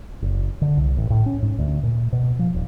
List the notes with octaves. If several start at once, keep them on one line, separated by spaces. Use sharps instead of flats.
F#1
D3
C2
A1
A2
C#4
G#2
D2
A#2
B2
F3
D#1